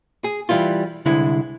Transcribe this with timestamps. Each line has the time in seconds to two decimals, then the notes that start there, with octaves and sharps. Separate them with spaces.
0.24 G#4
0.49 E3 G3 E4 F4
1.06 C2 D3 G#3 E4